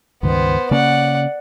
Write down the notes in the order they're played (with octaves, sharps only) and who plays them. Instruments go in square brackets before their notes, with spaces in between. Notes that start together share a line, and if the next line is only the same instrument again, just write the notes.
[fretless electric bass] C#2 G2 D#3 [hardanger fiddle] B3 C5
[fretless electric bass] C#3 A#3 C#4 [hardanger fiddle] D5 F#5